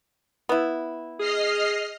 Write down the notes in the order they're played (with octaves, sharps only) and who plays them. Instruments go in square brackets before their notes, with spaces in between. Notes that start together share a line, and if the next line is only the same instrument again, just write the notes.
[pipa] B3 E4
[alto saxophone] G#4 [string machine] D#5 F6 C7